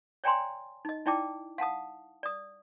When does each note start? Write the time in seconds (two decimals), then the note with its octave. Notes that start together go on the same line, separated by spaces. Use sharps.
0.24 C#5 D5 G5 G#5 A#5 C6
0.85 D#4 D#5
1.06 D#4 E4 D5 G5 A5 D6
1.58 F5 F#5 A5 D#6
2.23 D5 D#6